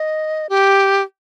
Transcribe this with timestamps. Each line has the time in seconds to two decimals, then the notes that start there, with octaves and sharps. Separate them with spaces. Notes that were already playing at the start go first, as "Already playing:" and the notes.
Already playing: D#5
0.49 G4